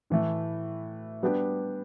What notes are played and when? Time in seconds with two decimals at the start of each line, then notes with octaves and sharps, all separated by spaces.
0.10 A2 E3 A3
1.23 G3 B3 D4 G4